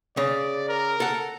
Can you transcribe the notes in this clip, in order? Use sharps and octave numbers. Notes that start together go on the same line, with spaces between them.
C#3 D5
A#4
A4 F#5